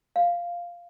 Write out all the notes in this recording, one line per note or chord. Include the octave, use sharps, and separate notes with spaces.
F5